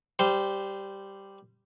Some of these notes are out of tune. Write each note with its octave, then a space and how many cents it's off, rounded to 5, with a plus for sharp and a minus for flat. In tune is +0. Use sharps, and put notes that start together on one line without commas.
G3 +0 C5 -15